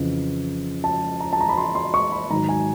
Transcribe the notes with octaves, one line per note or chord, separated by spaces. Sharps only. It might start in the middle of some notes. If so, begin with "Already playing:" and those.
Already playing: F2 C#3 E3
A5
A#5
A5
A#5
B5
C6
C6
C#6
B5
G#2 D#3 F#3 A#5
G#5